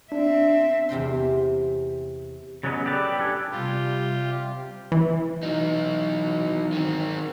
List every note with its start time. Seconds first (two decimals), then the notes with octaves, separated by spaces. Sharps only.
0.12 C4 D4 E5
0.89 E2 C3 G5 C6
2.63 C#3 F#3 B3 C#4 D#5
2.86 G4 A4 B4 D5
3.18 D4 G4 A4 G#5
3.51 C3 G3 F4 G4
4.92 E3
5.43 F#3 D#4
6.73 D#3 C4